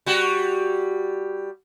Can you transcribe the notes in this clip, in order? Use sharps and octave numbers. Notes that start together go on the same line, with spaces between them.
G3 F#4